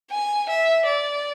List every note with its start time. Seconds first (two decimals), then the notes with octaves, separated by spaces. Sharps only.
0.12 G#5
0.50 E5
0.86 D5